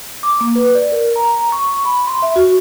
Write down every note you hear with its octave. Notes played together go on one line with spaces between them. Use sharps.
D6
A#3
B4
D5
A#4
A#5
C#6
B5
C6
E5
F#4